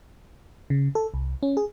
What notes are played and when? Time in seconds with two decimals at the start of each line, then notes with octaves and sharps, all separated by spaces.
0.70 C#3
0.95 A4
1.14 C2
1.43 C#4
1.57 G#4